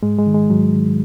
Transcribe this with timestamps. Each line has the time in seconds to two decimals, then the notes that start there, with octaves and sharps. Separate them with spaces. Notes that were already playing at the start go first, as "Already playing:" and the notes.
0.03 G#2 G#3
0.18 G#3
0.27 D#3
0.34 G#3
0.50 G#2 F#3
0.74 D#3